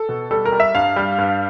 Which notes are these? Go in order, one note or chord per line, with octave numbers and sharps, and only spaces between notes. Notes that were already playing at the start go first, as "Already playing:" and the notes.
Already playing: A4
B2
G3 A4
A#4
G3
E5
G2 F5
G3
G2